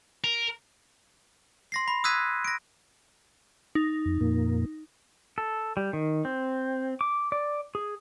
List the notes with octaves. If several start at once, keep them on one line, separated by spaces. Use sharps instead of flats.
A#4
C6 A#6 C7
B5
D#6 E6 F#6 G#6 B6 D#7
A#6 D7
D#4
F2
F2 A#2 A#3
A4
G3
D#3
C4
D6
D5
G#4